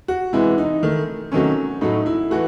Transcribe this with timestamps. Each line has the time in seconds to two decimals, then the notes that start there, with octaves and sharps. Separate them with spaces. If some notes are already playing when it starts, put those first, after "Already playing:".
0.08 F#4
0.33 C3 E3 G#3 E4
0.58 D#4
0.83 D#3 A3
1.32 C3 D#3 F#3 A3 C#4
1.81 A2 F#3 A3 D#4
2.06 E4
2.31 E3 A3 F#4